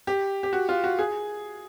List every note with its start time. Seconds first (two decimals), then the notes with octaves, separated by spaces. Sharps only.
0.07 G4
0.43 G4
0.53 F#4
0.69 F4
0.84 F#4
0.99 G#4